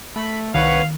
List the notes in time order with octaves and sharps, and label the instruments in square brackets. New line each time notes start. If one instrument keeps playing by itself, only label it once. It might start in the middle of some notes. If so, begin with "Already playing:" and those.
[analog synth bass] A3 [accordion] B5
[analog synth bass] C2 [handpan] D#3 [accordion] B4 C#5 F#5 [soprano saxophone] F5